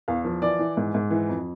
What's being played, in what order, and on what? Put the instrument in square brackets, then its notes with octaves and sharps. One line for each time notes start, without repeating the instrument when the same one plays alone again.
[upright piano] E2 F5
F3
E3 D5
E3
G#2
G#2
E3
F2